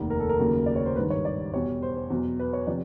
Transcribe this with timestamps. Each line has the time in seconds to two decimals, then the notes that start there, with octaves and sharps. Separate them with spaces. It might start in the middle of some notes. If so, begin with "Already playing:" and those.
Already playing: F1 D#2 D#3
0.10 A#4
0.20 A4
0.29 A#4
0.39 D#2 C#3 F#3 A#3
0.66 D5
0.76 C#5
0.86 C5
0.96 G#1 G2 D#3 B4
1.10 C#5
1.25 D5
1.54 E2 B2 G3 C#5
1.82 C5
1.97 C5
2.10 E2 B2 F#3
2.40 B4
2.53 C#5
2.67 C3 F3 D5